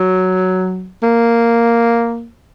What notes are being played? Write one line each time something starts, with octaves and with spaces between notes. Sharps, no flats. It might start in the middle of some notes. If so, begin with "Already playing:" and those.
Already playing: F#3
A#3